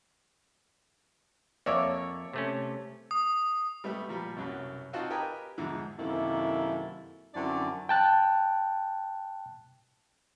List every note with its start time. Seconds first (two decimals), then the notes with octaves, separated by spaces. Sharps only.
1.66 F2 A#3 C#5 D5 E5
2.33 C3 A3 C#4
3.11 D#6
3.84 G3 A3 B3
4.09 A#2 F3 G3
4.37 C2 F#2 B2
4.93 C4 D#4 F4 F#4 F#5 A5
5.10 G4 A#4 B4 D#5 G5 G#5
5.57 E2 G#2 D3 F3
5.99 F#2 C3 D#3 A#3 E4 A4
7.34 F#2 D3 C4 D4 E4 D5
7.89 G5 A5 F#6